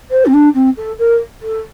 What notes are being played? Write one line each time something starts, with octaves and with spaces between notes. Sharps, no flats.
C5
C4
D4
C4
A4
A#4
A4